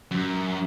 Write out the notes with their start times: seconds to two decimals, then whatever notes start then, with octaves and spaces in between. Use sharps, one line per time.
0.11 F#2